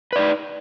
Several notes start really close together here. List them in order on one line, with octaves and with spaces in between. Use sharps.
B4 D5 D#4